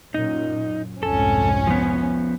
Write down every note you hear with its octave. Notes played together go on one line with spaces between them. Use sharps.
F#2 A#2 D#4
C2 F2 G#2 C#4 A4
F3 B3